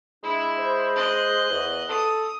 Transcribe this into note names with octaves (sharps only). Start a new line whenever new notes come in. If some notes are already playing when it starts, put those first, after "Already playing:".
G#3 D4 E4
C5
D#5 F#6
E2
A4 D#6